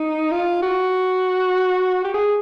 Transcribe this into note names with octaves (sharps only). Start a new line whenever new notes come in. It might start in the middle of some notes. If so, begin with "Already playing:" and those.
Already playing: D#4
F4
F#4
G4
G#4